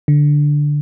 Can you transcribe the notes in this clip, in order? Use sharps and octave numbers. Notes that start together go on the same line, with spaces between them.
D3